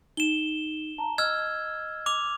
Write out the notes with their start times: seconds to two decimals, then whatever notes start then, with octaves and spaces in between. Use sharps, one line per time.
0.17 D#4 E7 G7
0.98 A5 A#5
1.18 D#5 E6 F6 G#6
2.06 D6 F7